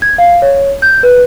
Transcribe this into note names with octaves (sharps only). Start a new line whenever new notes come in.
G#6
F5
C#5
G6
B4